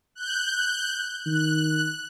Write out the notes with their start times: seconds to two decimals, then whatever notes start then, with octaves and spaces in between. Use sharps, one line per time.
0.15 F#6 G6
1.26 D#3 F#6